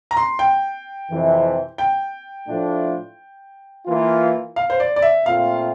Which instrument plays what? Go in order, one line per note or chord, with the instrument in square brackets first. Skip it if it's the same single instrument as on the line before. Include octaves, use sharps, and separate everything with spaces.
[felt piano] A#5
C6
G5
[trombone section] F2 C3 E3
[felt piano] G5
[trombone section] A2 F3 A3 D4 F4
E3 A#3 F4
[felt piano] F5
C5
D5
D5
E5
[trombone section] A#2 A3 C4 F4 [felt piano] F5